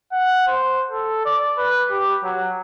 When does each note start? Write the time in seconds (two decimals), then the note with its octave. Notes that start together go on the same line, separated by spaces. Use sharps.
0.12 F#5
0.47 C5
0.91 A4
1.25 D5
1.58 B4
1.91 G4
2.23 F#3